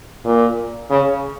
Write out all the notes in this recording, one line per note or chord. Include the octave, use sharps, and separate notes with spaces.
A#2
C#3